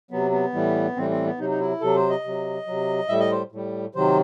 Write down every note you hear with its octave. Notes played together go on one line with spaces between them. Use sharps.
C3 F#3 B3
B3
A2 E3 G3
A2 E3 G3 C4
C4
B3
C3 F#3 D#4
D#4
E4
C3 F#3 A4
C5
D#5
C3 F#3
C3 F#3
A2 G3 E5
D#5
C5
A2 G3
C3 D#3 F#3 C5